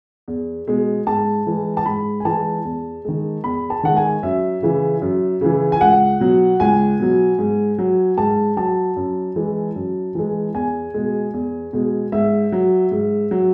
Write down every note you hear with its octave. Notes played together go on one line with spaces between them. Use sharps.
E2
B2 G#3
G#2 A5
E3 G#3
A5
G#2 B5
G#5
E3 G#3 A5
E2
D#3 G#3
E2 B5
A5
D#3 G#3 F#5
G#5
F#2 E5
C#3 E3
F#2
C#3 E3
G#5
C#2 F#5
B2 F#3
C#2 G#5
B2 F#3
G#2
F#3
G#2 A5
F#3 A5
F#2
E3 G#3
F#2
E3 G#3
E2 G#5
B2 G#3
E2
B2 G#3
G#2 E5
F#3
G#2
F#3